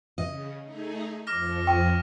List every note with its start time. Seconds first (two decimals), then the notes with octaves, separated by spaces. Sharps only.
0.18 C#3 D#5
0.63 A3 D#4 G#4
1.27 F2 F3 D6 F6 A#6
1.67 G5 C#6